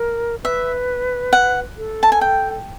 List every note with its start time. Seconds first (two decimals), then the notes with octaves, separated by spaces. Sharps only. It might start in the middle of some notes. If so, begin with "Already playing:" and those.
Already playing: A#4
0.44 B4 E5
1.33 F#5
1.77 A4
2.03 A5
2.12 G#5
2.21 G5